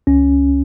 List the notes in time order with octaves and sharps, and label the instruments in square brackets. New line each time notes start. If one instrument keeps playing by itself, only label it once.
[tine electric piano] C#2 C#4